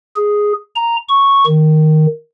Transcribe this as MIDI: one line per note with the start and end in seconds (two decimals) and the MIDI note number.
0.16 0.53 68
0.76 0.96 82
1.09 1.45 85
1.47 2.06 51